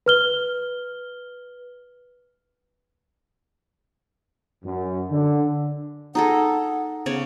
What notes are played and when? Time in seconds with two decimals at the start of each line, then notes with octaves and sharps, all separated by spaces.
0.06 B4 F6 G7
4.64 F#2
5.10 D3
6.15 D#4 G#4 A4 F#5
7.06 C#3 B3 C#5 D5